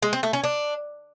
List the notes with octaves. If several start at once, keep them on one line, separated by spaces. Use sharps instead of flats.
G#3
C4
A3
C#4
D4